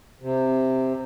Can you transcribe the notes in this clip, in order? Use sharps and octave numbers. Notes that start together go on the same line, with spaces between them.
C3